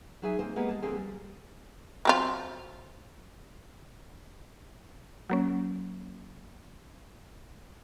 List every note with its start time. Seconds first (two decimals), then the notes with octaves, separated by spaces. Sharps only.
0.22 F#3 D#4 G#4 E5 G#5
0.39 A#3 C4 C5 D#5
0.56 G#3 A#3 B3 G4 G#4
0.69 G#3 A5
0.82 D3 F3 A#3 C4 G4 G#4
0.96 G3
2.05 F#3 C4 F4
5.30 F#3 A#3 C#4